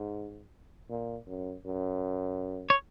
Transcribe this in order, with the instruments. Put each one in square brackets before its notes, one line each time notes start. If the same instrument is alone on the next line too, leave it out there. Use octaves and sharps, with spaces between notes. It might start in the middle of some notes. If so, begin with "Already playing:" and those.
Already playing: [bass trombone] G#2
A#2
F#2
F#2
[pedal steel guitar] C#5